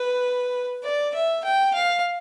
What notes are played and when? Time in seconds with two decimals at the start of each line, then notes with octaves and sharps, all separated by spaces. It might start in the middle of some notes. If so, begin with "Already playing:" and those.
Already playing: B4
0.83 D5
1.14 E5
1.44 G5
1.74 F5